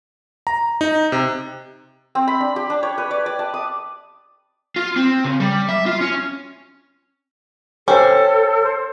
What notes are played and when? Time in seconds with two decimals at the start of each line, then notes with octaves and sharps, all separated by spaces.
0.47 A#5
0.81 D#4
1.12 C3
2.15 C4
2.27 B5
2.40 D4
2.56 G4
2.70 D4
2.83 C#5
2.98 B4
3.11 D5
3.26 D5
3.39 A5
3.54 D#6
4.76 F4
4.96 C4
5.24 C#3
5.40 G3
5.69 E5
5.86 F4
6.01 C#4
7.88 C#4 G4 A4 C5
8.63 C5